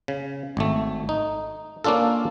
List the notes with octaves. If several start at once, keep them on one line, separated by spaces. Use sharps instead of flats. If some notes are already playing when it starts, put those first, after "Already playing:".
C#3
G#1 A3
D#4
A#3 C#4 D4 F4 A4